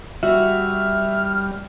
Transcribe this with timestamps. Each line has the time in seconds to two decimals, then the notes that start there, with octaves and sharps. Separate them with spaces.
0.23 G3 F#4 E5 F6